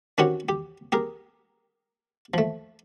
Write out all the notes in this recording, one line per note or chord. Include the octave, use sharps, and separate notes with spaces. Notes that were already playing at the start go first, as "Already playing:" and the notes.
D#3 C4 C#4 F#4 G4 C#5
G4
G4 G#4 A#4
F3 A3